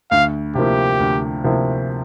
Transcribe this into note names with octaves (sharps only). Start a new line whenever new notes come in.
D2 F5
C3 F3 A#3 E4 G4
D2
C3 F3 A#3 E4